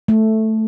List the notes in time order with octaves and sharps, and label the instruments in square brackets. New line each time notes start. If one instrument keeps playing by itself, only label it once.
[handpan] A3